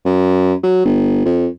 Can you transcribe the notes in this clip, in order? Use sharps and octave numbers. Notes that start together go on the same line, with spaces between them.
F#2
F#3
G1
F2